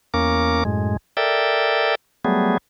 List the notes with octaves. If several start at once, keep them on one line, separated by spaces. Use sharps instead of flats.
E2 A#3 C#4 A#4 D6
F#2 A2 G#3
A4 A#4 D5 E5 G5
F#3 G3 A3 B3 G#4